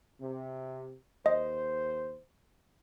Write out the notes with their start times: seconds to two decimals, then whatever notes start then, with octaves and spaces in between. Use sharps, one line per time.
0.20 C3
1.26 D#2 C5 D#5